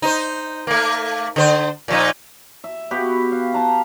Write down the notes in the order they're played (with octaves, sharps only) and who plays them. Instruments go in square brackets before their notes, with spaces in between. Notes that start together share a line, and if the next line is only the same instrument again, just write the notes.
[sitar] D#4 C5
A3 A#3
D3 C5
A#2 F3 D#4
[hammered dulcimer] E5
B3 F#4 G4 B5
F5
G5 A5 A#5